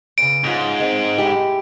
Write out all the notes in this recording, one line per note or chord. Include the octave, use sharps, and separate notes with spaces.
E2 C#3 D7
G#2 C#4 F4
G#3 C4
G#3 E4 G4